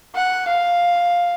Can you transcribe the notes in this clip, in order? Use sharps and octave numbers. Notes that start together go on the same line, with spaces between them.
F#5
F5